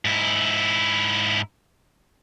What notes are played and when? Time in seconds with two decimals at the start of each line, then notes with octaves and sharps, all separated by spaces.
0.05 G#2 E4